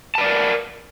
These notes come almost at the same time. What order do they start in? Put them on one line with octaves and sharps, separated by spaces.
A5 B4 D5 A#4